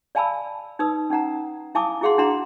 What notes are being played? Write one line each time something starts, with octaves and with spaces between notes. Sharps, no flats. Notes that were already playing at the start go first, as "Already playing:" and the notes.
D5 F5 G#5 A5 B5 E6
D#4 B4 D#6 E6
C#4 D#4 F#5 A#5
E4 F5 G#5 A5 D6 D#6
E4 F#4 G#4 F5 F#5 C6
D4 E4 F#4 F#5 A#5 C6